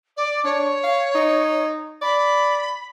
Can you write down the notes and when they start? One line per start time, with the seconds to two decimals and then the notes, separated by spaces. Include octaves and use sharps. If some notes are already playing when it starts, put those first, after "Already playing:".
0.17 D5
0.44 D4 C#5
0.84 F5
1.15 D#4
2.02 D5 B5